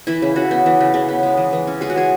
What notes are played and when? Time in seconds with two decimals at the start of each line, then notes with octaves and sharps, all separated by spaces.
0.07 E3 E4
0.22 C#3
0.36 C#3 F#4
0.51 B3
0.66 E3
0.80 C#3
0.94 C#3
1.08 B3
1.23 G#3
1.37 E3
1.53 E3
1.67 C#4
1.81 G#3 G#4
1.90 F#4
1.96 E3 G#4